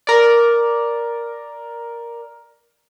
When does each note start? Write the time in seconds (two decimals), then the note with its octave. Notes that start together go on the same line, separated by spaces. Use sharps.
0.07 A#4 D5